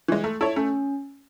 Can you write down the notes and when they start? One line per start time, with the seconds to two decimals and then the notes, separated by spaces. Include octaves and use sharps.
0.08 E3 G#3
0.24 A3
0.41 E4 A4 C#5
0.56 A3 C#4